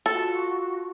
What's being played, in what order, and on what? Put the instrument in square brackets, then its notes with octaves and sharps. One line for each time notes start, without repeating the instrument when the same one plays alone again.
[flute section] F4 F#4 [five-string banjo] A4